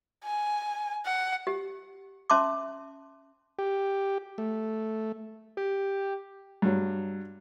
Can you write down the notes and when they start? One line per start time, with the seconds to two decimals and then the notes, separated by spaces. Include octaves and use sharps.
0.24 G#5
1.05 F#5
1.47 G4
2.30 C#4 E5 A5 C6 D6
3.59 G4
4.38 A3
5.57 G4
6.62 G2 F#3